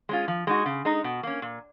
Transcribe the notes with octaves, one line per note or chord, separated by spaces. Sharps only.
G#3 C#4 F4
F3
G#3 D#4 F#4
C#3
G#3 D#4
B2
A#3 C#4
A#2